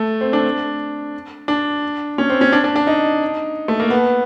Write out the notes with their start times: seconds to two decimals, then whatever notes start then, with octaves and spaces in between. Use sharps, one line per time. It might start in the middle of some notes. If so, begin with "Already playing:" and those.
Already playing: A3
0.21 C4
0.33 D4
1.48 D4
2.18 C#4
2.30 C4
2.41 C#4
2.52 D4
2.64 D4
2.76 D4
2.87 D#4
3.68 A3
3.80 A#3
3.90 B3